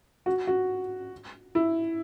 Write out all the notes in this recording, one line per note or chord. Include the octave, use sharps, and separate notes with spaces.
F#4
F#4
E4